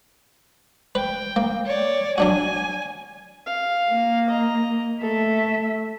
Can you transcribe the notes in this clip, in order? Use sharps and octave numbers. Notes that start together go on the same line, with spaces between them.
B4 G5
A#3
C#5 D5
F#3 D4 F#4 G#5
F5
A#3
D#5 A#5
A3 A4 E5